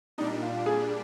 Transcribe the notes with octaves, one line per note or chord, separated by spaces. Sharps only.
A#2 G3 D4 D#4
F4
G#4